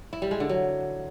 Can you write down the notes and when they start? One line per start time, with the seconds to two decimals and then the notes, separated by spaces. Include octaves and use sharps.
0.13 E4
0.22 G3
0.31 G#3
0.40 D3
0.49 F#3